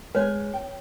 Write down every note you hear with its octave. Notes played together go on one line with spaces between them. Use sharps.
G#3 B4 C#5 G#5
G5